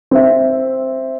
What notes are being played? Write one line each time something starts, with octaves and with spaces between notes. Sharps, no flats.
C4 E5